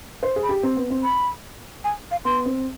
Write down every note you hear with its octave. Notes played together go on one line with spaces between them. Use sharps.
C5
G#4
B5
G4
C4
B3
C4
B5
G#5
F5
B3 C6
C4